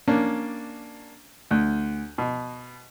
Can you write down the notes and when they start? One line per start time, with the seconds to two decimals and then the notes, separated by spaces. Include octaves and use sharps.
0.08 A#3 C#4 D4
1.51 D2
2.18 B2